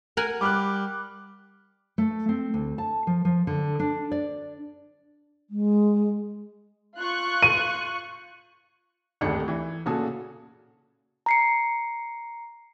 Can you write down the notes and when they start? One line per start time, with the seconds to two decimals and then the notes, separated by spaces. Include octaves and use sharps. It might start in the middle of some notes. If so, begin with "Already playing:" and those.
0.17 A#4 F#5 G#5
0.41 G3 D6 F6 F#6
1.98 A3
2.29 C4
2.54 D2
2.78 A5
3.07 F3
3.25 F3
3.47 D3
3.80 D4
4.11 D5
5.50 G#3
7.00 F4 C#6 F#6
7.43 D#7
9.21 D#1 G#1 D2 D#3 D4 C#7
9.48 E3
9.86 A#2 C#3 F#4 G#4 A4
11.26 A#5 C7 C#7